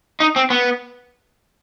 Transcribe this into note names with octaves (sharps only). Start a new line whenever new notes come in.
D#4
C4
B3